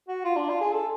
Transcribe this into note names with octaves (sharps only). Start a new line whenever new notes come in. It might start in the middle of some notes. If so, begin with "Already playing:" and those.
F#4
F4
D4
F4
G#4
A4